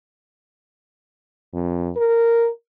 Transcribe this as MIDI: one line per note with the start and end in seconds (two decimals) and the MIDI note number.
1.54 1.91 41
1.97 2.48 70